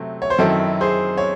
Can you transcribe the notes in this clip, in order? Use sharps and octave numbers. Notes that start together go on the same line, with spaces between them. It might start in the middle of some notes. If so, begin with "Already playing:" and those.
Already playing: C3 F#3 A3 C4
C#5
C5
F#2 D#3 F#3 C4 E4 A4
G#4 C5
C#5